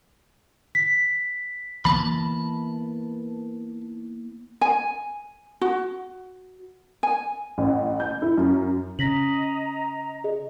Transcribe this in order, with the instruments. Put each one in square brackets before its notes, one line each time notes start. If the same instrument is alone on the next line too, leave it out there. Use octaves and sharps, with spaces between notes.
[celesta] B6
[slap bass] E3 A#3 B3 [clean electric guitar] A5 B5
[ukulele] G#5
F#4
G#5
[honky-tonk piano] A1
G6
E4
F#2
[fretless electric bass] C#3 [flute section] D#5 A#5 [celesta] A#6 B6 F#7
[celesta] G#4 D#5